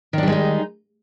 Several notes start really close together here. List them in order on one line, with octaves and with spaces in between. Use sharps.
D#3 D4 G3 G#3 D#4